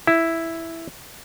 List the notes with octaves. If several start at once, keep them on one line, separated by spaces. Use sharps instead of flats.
E4